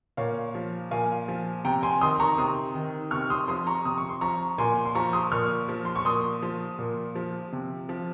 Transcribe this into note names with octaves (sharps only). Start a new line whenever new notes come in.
A#2 C#5 F5
F3
A#2 F5 G#5
F3
C3 G5 A#5
G#5 C6
D#3 C6 D#6
A#5 C#6
C3 C6 D#6
D#3
C3 C#6 F6
C6 D#6
F3 C6 D#6
A#5 C#6
C3 D#6
C#6
C6
F3 A#5 C#6
A#2 G#5 C6
C6
F3 A#5 C#6
C6 D#6
A#2 C#6 F6
F3
C6
C#6
A#2 C6 D#6
F3
A#2
F3
C3
F3